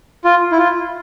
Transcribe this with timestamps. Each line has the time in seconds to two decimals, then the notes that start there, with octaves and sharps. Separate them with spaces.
0.24 F4
0.52 E4
0.58 F4